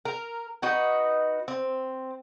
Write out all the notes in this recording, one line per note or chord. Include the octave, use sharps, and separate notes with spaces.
A#4
D#4 F#4 B4
C4